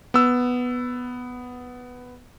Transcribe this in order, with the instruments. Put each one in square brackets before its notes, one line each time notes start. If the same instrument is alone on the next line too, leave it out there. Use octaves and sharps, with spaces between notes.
[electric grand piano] B3 E6